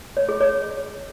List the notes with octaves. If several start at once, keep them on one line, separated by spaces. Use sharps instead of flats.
C#5
G#4
C#5